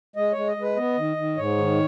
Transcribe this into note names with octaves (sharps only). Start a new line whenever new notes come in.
G#3 D#5
G#3 C#5
D#5
G#3
B4
B3 D#5
D#3
D#3
G#2 C#5
D#3